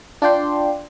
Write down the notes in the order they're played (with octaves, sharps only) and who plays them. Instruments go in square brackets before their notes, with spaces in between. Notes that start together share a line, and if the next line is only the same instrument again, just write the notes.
[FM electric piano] D4 F4 D5 G5 C6